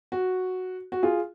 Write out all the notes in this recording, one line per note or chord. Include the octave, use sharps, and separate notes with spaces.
F#4
F#4
F4 G#4